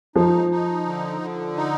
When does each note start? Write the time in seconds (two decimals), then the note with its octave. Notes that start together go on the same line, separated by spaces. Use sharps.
0.16 F3 D#4
0.51 D#4
0.86 D3
1.21 D3
1.56 D#4